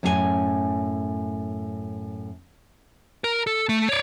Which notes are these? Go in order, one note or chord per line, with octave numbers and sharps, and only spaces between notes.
F#2 A2 C#4 F#4 G#5
A#4
A4
A3
C#5 D5